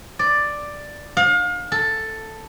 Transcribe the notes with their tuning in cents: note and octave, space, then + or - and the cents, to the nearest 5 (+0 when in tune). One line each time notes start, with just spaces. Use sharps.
D5 +5
F5 +35
A4 +5